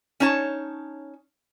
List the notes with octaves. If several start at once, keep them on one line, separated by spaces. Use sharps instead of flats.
C#4 D#4 C#5 A5